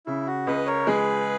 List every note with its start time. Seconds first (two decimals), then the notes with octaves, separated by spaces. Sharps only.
0.06 C#3 E4
0.27 F#4
0.47 C#2 B4 D#5
0.66 A#4 C#5
0.87 G#3 G#4 B4